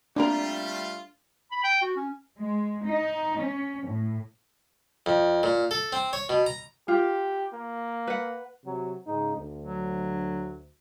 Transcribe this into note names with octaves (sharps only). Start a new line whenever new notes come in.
G3 A3 A#3 C4 D4 F4 A#4
B5
G5
F#4
C#4
G#3
D#4
C#4
A2
F2
A#2
A4
C4
C#5
B2
A#5
F4 G4
A#3
B4 F#5
C3 F#3
G#2 C#3 D#4
D2
F#3